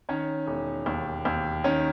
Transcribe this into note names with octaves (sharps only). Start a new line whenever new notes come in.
D#3 C#4 C#5
E1
D#2
D#2
D#3 C#4 C#5